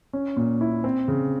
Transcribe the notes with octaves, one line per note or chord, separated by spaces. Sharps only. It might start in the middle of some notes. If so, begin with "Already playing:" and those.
C#4
A#2
E4
C4
C#3